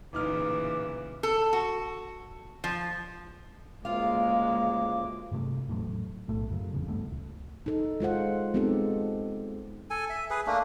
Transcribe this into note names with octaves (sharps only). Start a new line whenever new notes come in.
D1 A#2 C#3 E3 D#4 B4 D6 F6
A4
F#4
F3
D2 C#3 G#3 A#3 F4 F5 D6
G2 C3 A3
E2 A2 F#3 A3
B1 A2 A3
F#2 C#3 F#3
G#1 E2 C#3
D#1 G2 A3 B3
C#2
D#4 A4
G#3 F4 C5 F#5
G#3 B3 C4 D#4 G4 A4
A4 G#5
E5
G#4 B4
A3 A#3 D4